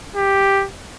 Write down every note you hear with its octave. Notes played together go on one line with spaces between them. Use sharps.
G4